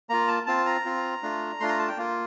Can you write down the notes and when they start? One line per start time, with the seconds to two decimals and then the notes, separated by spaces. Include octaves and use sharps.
0.09 A#3 F4 A#5
0.28 A5
0.47 C4 F4 A5
0.66 A#5
0.85 C4 F4
1.22 A3 D4 F4
1.60 A3 D4 F4 C6
1.69 A#5
1.79 A5
1.88 G5
1.97 A#3 F4